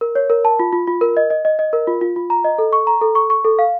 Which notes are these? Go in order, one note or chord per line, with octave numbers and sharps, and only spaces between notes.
A#4
C#5
A#4
A5
F4
F4
F4
A#4
D#5
D#5
D#5
D#5
A#4
F4
F4
F4
A#5
D#5
A4
C#6
A#5
A4
C#6
C#6
A4
F5